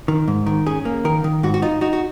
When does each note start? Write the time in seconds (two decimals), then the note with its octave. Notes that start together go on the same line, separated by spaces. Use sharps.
0.08 D#3
0.28 G#2
0.46 D#3
0.66 C#4 G#4
0.85 A#3
1.05 D#3 A#4
1.24 D#3
1.43 G#2 F#4
1.54 F#4
1.62 D#4 F4
1.81 D#4 F#4
1.93 F#4